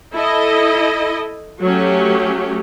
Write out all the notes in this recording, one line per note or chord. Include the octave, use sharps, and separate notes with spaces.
E4 A4 D#5
F#3 A3 C#4 G4